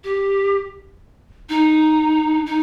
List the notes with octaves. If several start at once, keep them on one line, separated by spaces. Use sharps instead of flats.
G4
D#4
D#4